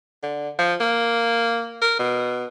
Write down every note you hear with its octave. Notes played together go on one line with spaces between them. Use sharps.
D3
F3
A#3
A#4
B2